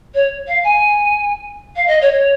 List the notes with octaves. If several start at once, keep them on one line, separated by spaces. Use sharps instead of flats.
C#5
F5
G#5
F5
D#5
C#5
C#5